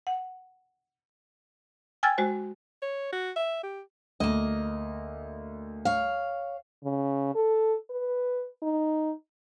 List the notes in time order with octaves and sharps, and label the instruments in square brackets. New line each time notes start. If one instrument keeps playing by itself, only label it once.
[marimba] F#5
G5 G#5 E6 F6 G#6 A6
G#3 F#4 C5
[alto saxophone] C#5
F#4
E5
G4
[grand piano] D2 [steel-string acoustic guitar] A#3 D#5
[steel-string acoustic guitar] C#5 F5
[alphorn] C#3
A4
B4
D#4